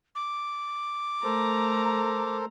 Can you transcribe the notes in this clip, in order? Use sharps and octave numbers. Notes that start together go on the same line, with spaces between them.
D6
A3 A4 A#4 C5 A#5